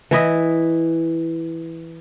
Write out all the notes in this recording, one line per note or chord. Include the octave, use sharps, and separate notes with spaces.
E3 E4 D#5